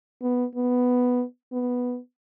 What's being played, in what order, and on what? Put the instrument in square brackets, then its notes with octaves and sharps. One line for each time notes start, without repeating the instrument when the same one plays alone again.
[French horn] B3
B3
B3